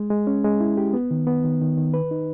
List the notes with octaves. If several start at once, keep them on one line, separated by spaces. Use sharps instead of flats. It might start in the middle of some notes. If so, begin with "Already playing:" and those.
Already playing: G#3
G#3
C#4
G#3
E4
G4
B3
D#3
B3
D#3
D#3
D#3
B4
D#4